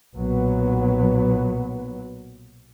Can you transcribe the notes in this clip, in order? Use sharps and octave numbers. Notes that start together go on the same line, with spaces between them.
B1 A#2 F#3 B3